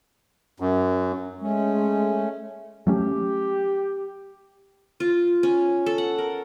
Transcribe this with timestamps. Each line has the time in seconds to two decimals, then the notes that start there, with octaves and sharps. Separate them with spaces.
0.60 F#2
1.40 G#3 A3 C#4
2.87 F#3 A3 C#4 G4
5.00 F4
5.43 C#4
5.86 A4
5.98 F#5
6.18 A#4